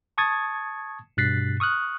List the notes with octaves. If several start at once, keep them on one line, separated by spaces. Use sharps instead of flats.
A5 C#6 D#6 G#6 A6
G2 B2 F#6 A6 B6 C7
C#6 D#6 F6 F#6